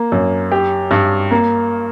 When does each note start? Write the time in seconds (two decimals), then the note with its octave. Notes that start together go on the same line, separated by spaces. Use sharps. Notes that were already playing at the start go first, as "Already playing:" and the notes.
Already playing: A#3
0.12 F#2
0.51 G4
0.91 G2
1.31 A#3